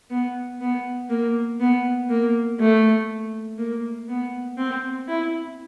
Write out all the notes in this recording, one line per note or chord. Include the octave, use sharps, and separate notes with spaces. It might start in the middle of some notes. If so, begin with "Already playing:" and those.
B3
B3
A#3
B3
A#3
A3
A#3
B3
C4
E4